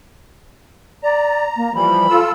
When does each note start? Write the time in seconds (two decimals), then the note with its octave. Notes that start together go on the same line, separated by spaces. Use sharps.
1.03 D5 A#5
1.57 A#3
1.74 E3 F3 G3 B5
2.09 F4 A4 E6